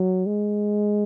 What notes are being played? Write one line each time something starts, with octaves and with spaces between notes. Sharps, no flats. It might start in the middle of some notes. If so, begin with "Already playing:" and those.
Already playing: F#3
G#3